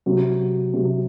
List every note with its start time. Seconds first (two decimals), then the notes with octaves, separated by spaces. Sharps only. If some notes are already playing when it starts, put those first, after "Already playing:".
0.06 C3 F#3 C4
0.74 C3 F#3 C4